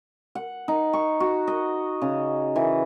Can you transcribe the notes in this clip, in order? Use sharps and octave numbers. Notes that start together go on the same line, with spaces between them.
F#5
D#4
C#6
F#4
D#5
C#3
E3